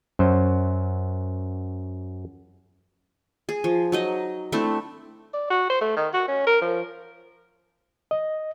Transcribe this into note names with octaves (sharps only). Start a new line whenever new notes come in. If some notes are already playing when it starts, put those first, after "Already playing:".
F#2 F#3 C5
G#4
F3
F#3 D#4 D#5
A3 C4 D4 E4
D5
F#4
C5
A3
D#3
F#4
C#4
A#4
F3
D#5